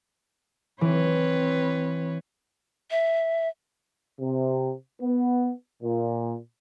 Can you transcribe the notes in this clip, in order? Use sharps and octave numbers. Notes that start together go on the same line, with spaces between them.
E3 C4 B4 C#5
E5
C3
B3
A#2